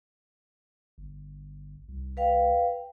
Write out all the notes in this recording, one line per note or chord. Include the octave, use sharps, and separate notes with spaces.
G1
C2
B4 F5 G5